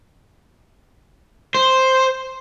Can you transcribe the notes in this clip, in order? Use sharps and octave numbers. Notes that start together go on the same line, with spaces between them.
C5